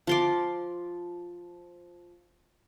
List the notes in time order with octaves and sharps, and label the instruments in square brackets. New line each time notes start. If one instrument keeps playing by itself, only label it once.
[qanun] F3 C6 D6